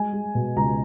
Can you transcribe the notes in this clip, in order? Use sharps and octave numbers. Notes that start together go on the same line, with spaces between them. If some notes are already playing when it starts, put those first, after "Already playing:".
Already playing: G#3 G#5
G#3
B2
C#2 A#5